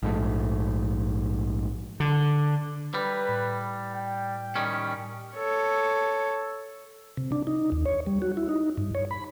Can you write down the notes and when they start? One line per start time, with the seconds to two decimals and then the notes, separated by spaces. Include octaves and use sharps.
0.03 A#1 G#2 A3
2.00 D3
2.94 G3 B4
3.29 A2
3.93 G5
4.56 D#3 G3 C#4
5.35 A4 C#5
7.17 C3
7.32 D4
7.47 D#4
7.72 D#2
7.86 C#5
8.07 G3
8.22 F#4
8.37 E4
8.49 D#4
8.77 G2
8.95 C#5
9.11 B5